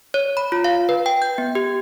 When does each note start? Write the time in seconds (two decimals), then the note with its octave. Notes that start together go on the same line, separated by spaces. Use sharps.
0.14 C#5
0.37 B5
0.52 F4
0.64 F5
0.89 B4
1.06 G5
1.22 G6
1.38 B3
1.55 G4